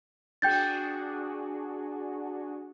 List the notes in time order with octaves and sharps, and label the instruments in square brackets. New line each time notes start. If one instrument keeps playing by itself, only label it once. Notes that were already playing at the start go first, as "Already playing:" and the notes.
[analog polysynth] D4 F#4 G#4 [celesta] G5 G6 A6